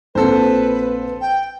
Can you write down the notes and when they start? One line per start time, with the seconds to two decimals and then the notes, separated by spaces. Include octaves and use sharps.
0.15 A#1 C4 A4 B4 C5
1.21 G5